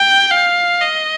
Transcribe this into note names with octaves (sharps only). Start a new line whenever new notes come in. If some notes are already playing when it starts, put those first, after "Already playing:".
Already playing: G5
F5
D#5